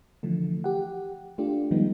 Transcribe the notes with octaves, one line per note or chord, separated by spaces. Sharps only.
D3 E3 F3 A3
G4 F#5
A3 D4 F4 G4
D#3 F3 G3 G#3 B3 D#4